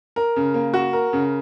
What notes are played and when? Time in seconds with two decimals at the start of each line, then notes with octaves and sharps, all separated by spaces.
0.16 A#4
0.36 C#3
0.54 A#3
0.74 F#4
0.93 A#4
1.13 C#3